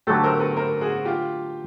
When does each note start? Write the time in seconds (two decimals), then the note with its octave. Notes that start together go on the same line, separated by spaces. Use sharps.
0.07 D3 F#3 A3 G4 A4
0.24 A#4 C5
0.40 A4 B4
0.57 A#4 C5
0.81 F#4 G#4
1.05 F4 G4